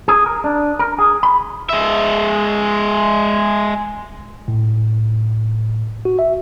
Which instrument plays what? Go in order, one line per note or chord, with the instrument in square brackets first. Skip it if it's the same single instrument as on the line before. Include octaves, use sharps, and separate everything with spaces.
[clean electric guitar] G#4
A#4
D4
A#4
G#4
B5
[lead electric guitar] G#3 E5
[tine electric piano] A2
F#4
E5